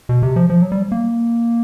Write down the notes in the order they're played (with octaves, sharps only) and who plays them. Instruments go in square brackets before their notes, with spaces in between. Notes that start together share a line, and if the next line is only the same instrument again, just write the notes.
[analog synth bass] B2
C3
F3
F3
F#3
G3
A#3